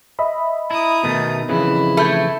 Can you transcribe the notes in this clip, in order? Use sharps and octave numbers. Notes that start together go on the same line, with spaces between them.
D#5 E5 B5
E4 A#5 D#6
B2 D#3 A3
F2 C#3 E3 E4
A3 B5 G6 G#6